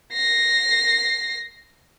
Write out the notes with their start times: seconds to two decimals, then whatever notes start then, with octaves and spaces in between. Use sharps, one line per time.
0.14 A#6 C7